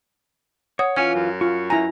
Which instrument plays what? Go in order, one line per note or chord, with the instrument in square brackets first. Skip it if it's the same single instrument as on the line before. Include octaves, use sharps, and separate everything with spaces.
[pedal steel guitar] C#5 [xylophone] F#5 D#6
[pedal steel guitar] E3 F4 [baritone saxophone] C#4 [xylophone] C#5 G#5
[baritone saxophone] F#2
[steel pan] F4 [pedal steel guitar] C#6
[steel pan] E4 A#5 [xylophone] G#5